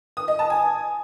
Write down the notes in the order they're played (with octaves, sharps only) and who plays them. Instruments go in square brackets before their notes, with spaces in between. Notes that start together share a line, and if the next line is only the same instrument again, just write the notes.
[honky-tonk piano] D#6
D#5
A5
G#5